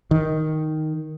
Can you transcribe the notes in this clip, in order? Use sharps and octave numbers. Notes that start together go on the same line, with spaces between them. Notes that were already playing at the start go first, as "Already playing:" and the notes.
D#3